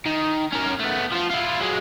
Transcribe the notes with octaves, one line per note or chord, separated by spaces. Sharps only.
D#3
C#4 A#4
A3 B3
F3 F4
E4 F4
F#3 G#3